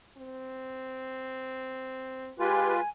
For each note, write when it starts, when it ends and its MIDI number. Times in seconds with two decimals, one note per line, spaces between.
0.17 2.32 60
2.39 2.82 56
2.39 2.81 65
2.39 2.73 67
2.39 2.81 71
2.39 2.89 80